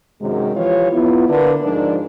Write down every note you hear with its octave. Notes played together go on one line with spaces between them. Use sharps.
F#2 C3 D#3 F#3 G#3
E3 F3 F4 G4 C#5
B3 E4 F4
D3 A#3 B4
G#2 F3 D4 D#4 A#4 D5